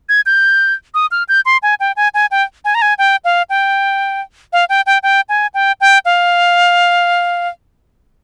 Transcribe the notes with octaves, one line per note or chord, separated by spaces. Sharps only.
G#6
G6
D#6
F6
G6
C6
G#5
G5
G#5
G#5
G5
G#5
A#5
G#5
G5
F5
G5
F5
G5
G5
G5
G#5
G5
G5
F5